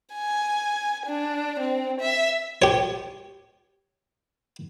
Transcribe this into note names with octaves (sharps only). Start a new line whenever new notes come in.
G#5
D4
C4
E5
G4 C#5